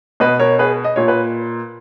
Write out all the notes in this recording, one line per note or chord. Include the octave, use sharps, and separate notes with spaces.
B2 B4 D#5
A#4 C#5
G#4 B4
D#5
A#2 C#5
B4